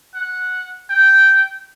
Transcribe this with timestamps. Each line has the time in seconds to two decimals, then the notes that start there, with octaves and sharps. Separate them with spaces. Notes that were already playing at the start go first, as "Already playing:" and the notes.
0.15 F#5
0.90 G5